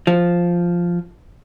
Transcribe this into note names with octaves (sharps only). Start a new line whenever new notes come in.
F3